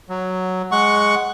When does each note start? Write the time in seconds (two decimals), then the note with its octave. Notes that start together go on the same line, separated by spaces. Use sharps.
0.09 F#3
0.72 G#3 F#5 C#6